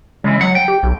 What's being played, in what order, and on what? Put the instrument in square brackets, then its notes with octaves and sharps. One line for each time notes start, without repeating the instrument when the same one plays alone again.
[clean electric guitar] C#3 E3 [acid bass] G#3
[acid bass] F#3 [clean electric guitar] F#5
[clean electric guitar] G5
[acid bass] G4
B1